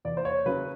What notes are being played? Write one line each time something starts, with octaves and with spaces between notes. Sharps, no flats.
E2 D5
C5
C#5
C#3 F#3 B4